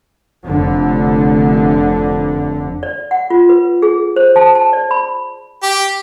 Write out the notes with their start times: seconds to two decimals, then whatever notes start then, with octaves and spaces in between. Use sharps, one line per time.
0.44 F1 D3
2.83 D5
3.11 F#5
3.30 F4
3.49 B4
3.82 G#4
4.16 C5
4.36 A5
4.55 A5
4.73 D5
4.91 B5
5.63 G4